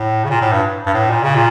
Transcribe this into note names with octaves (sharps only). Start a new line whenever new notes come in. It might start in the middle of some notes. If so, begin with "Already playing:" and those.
Already playing: A2
C#3
A#2
A2
G2
G2
A2
A#2
C#3
A#2